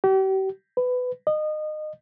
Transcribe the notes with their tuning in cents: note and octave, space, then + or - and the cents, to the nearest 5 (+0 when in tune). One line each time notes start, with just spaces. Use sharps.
G4 -40
B4 +20
D#5 -25